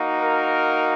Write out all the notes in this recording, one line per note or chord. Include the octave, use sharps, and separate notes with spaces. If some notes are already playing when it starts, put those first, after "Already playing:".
Already playing: A#3 D#4 F#4
A#4